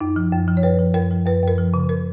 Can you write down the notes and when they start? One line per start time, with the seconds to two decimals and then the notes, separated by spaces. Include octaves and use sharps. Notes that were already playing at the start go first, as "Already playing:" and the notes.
0.01 F#2 D#4
0.16 F3
0.32 F#2
0.48 F3
0.57 C#5
0.63 F#2 B4
0.79 F3
0.94 F#2 A#4
1.11 F3
1.26 F#2 B4
1.43 F#2 A#4
1.58 F3
1.74 C#3
1.89 A#4